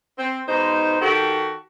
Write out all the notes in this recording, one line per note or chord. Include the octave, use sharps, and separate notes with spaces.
C4
G#2 B2 D#4 C5
D#3 F#4 G4 A4